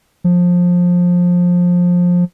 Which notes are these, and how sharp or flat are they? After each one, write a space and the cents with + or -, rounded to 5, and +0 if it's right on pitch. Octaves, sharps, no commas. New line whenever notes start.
F3 +20